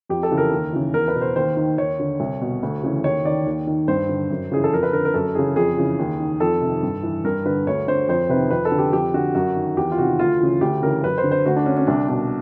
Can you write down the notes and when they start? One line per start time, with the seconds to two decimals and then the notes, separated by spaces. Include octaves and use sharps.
0.09 F2 G4
0.23 A4
0.31 C#3 E3
0.38 A#4
0.51 D#2
0.73 C#3 E3
0.93 E2 A#4
1.08 B4
1.14 B2
1.21 C5
1.36 D#2 C5
1.57 D#3
1.78 D#2 C#5
1.99 D3
2.20 C2
2.41 B2
2.63 D2
2.84 C#3 E3
3.04 D#2 C#5
3.25 D#3 D5
3.46 D#2
3.67 D#3
3.88 G2 C5
4.09 D3
4.30 F#2
4.52 C#3 E3 G#4
4.64 A4
4.73 F2 A#4
4.83 B4
4.93 D3 A#4
5.05 A#4
5.14 F#2 A4
5.35 C#3 E3 G#4
5.56 F2 G#4
5.78 C#3 E3
5.99 D#2
6.20 D#3
6.40 F2 A4
6.61 C3 D#3
6.83 G2
7.03 E3
7.24 G2 A#4
7.46 D3 B4
7.67 D2 C#5
7.88 D3 C5
8.09 F2 C5
8.29 C3 D#3 B4
8.51 F2 B4
8.65 A4
8.72 D3
8.79 G4
8.93 F2 G4
9.14 D3 F#4
9.35 F#2 F#4
9.56 D#3
9.77 E2 G4
9.91 F4
9.98 C3 D#3 F#4
10.19 D2 F4
10.40 C#3 E3
10.61 D2 G4
10.82 C#3 E3 A#4
11.03 F#2 B4
11.18 C5
11.24 D3
11.31 C5
11.46 D2 F#4
11.57 D4
11.66 D3 C#4
11.77 C#4
11.87 C2 D4
12.09 B2 D4